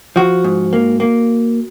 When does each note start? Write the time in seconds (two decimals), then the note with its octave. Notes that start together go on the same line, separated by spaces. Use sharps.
0.16 F3 F#4
0.44 G#2
0.73 A#3
1.00 A#3